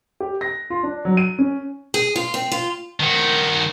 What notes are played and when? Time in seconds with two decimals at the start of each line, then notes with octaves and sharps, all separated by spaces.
0.20 G4
0.41 A#6
0.70 F4
0.83 D4
1.05 F#3
1.17 D#7
1.39 C#4
1.94 G#4
2.16 F4
2.34 C4
2.52 F4
3.00 D#3 F#4